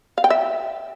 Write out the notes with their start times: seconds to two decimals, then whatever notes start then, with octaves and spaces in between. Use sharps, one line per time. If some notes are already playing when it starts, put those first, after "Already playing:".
0.18 F5
0.24 G5
0.30 E5